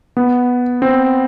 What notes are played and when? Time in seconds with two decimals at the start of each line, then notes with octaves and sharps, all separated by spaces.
0.17 B3
0.82 C4